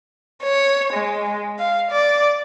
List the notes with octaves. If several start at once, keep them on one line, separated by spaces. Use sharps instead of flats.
C#5
G#3
F5
D5